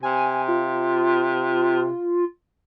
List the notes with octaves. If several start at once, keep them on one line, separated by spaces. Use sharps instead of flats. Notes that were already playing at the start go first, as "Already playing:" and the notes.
C3 G#5
F4